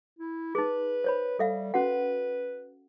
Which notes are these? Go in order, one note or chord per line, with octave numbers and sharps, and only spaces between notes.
E4
D#4 G#4 B4
C5 C#5 B5
G3 A4 E5 F5
C#4 F#4 B4 F#5